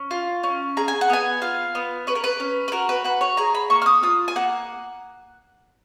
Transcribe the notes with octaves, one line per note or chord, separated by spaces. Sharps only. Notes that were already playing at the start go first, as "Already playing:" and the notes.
Already playing: C#4
F4
C#4
G#4 A#5
G#5
F#5
B3 G#5
F4 F5
B3
C#4 B4
A#4
B4
C#4
B4
F#4 A#4
B4
F#4 B4
C#5
G#4 A#5
B5
A#3 C#6
F6
D#6
F4 D#6
G#5
A#3 F#5